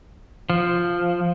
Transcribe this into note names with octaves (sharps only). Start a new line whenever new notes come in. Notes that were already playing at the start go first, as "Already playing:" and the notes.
F3